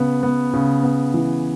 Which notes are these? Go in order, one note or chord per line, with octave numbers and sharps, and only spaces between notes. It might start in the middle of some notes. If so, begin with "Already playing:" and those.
Already playing: C#3 B3
B3
C#3
B3
E3